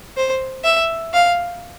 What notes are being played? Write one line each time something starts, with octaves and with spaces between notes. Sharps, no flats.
C5
E5
F5